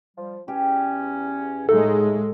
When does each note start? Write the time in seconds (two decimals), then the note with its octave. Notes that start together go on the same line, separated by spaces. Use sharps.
0.17 F3 G3
0.48 E2 C#4 G4
1.69 A2 F#3 G#3 A3 D#4 A4